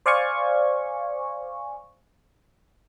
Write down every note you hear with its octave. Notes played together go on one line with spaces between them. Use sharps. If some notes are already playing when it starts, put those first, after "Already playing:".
C5 D5 F5 G#5 C#6